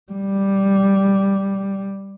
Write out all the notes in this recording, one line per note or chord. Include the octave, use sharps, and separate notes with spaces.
G3